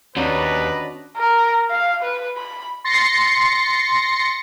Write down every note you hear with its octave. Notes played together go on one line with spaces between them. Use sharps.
D#2 C#4 D4 F#4 B4 D5 D#5 A#5
A#4
F5
B4
B5
C6 A6 A#6 C7 C#7